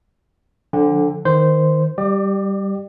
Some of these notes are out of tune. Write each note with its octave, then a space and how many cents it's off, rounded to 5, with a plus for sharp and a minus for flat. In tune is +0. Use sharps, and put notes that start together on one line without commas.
D3 +0 F3 +30 G5 +40
D#3 +0 C5 -10
G3 +0 G4 -5 D5 +35